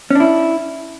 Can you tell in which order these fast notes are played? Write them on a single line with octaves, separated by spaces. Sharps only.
C#4 D4 E4